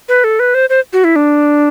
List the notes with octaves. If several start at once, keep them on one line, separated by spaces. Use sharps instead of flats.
B4
A4
B4
C5
C5
F#4
E4
D4